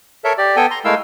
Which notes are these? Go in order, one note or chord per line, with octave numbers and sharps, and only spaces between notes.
A4 A#4 C#5 E5
G4 D5
B3 A4 G5 G#5
A#5 C6
G#3 A3 E4 A#4 F5 E6